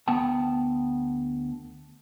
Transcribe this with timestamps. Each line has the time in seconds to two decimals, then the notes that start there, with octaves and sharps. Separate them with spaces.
0.08 D2 B3 F#5 G5 A5